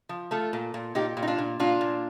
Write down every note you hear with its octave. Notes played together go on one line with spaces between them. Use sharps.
F3
A3 F4 A4
A#2
A#2
A#2 D#4 G4
A#2
D#4
D4 F4
A#2
A#2 D4 F4
A#2